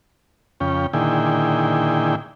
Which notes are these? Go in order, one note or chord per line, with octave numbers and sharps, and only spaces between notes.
F2 C#3 C#4 G5
A#2 D3 D#3 E4 G#4 G5